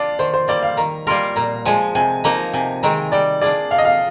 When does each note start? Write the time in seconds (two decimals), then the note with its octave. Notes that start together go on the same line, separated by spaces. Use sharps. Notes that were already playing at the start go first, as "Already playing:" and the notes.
Already playing: D4 F4 D5
0.19 D#3 C5
0.34 C5
0.48 G3 A#3 D5
0.63 F5
0.77 D#3 A#5
1.07 G3 A#3 F4 A#4 C6
1.36 A#2 A#5
1.65 F3 G#3 G#5
1.95 C3 G#5
2.24 F3 A#3 D#4 A#5
2.53 C3 G#5
2.83 D#3 G#3 C4 A#5
3.12 G3 D5
3.41 D4 F4 G#4 D5
3.71 C3 F5
3.78 D#5
3.85 F5